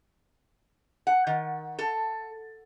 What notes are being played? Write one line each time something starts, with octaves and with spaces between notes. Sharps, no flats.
F#5
D#3
A4